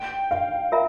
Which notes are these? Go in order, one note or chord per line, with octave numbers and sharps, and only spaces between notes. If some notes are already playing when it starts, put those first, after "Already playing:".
Already playing: G5
F5
F4 A#4 E5 A#5